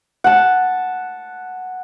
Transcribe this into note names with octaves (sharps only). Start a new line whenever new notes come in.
F#5 A5